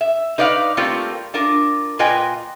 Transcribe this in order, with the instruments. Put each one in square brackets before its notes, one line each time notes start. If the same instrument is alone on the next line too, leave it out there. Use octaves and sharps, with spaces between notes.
[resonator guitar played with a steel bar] E5
D#4 B4 D5 D#5 F5
G3 A3 A#3 C4 F4
D4 F4 A#4
A#2 F4 B4 D#5 G5 G#5